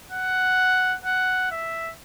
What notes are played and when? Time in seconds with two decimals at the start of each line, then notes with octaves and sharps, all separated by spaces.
0.11 F#5
1.05 F#5
1.51 E5